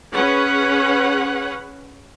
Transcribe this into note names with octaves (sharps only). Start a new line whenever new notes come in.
C#4 G#4 B4 C#5 F#5